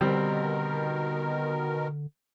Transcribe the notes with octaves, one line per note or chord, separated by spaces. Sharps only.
B2 D3 D#3 G3 C4 A#4